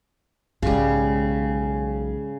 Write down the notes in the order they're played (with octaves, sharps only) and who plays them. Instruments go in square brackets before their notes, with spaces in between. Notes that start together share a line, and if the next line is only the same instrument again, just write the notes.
[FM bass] B1 [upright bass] G#2 G#3 [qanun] C#3 G3